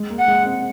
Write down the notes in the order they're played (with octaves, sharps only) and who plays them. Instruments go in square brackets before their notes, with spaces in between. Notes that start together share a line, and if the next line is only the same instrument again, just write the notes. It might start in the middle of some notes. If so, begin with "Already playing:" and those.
Already playing: [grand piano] G#3
A#3
[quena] F#5
[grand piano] G#3
C4